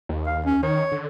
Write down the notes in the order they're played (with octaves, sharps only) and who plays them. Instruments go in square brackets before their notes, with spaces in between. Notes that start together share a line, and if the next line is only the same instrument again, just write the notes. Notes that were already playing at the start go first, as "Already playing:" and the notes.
[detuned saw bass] D#2
[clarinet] F5
C#4
[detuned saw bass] D#3 [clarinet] C#5
[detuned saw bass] D3